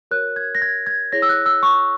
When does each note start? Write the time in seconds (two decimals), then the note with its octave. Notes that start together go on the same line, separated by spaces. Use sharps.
0.11 F#4 A#4 C#5 F#6
0.36 G#6
0.55 A#6
0.62 G#6
0.87 G#6
1.12 E4 G#4 C#5 A#6
1.22 E6
1.29 F#6
1.46 E6
1.63 C#6